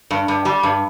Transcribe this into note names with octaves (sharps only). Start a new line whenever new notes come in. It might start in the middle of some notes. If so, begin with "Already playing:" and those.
G2
G2
G3
G2